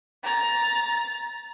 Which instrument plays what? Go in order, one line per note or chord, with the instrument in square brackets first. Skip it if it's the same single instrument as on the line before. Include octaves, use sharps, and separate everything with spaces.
[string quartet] A#5 A6